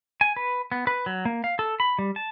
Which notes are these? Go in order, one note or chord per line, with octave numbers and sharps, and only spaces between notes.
G#5
B4
B3
B4
F#3
A#3
F5
A4
B5
G3
A5